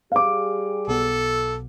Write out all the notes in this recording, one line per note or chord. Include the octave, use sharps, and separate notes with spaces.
G3 G4 G#4 F5 D6
B1 B3 A4